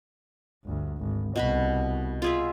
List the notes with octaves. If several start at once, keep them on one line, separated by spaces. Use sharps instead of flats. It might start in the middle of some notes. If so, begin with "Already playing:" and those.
G1 D2
G#1
C2 B2 F#4 B5
F4 G#4 E5